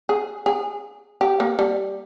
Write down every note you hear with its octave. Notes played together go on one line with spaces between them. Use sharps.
G#4
G#4
G4
A#3
G3